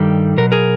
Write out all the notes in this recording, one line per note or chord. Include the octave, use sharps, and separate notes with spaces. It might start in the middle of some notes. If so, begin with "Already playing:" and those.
Already playing: G2 D#3 G3 G4 A4
B2 F#3 A#4
G#4 A#4